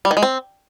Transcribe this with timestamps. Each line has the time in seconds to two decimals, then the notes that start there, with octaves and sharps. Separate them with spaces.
0.05 G3
0.11 D#3
0.17 G#3
0.23 C4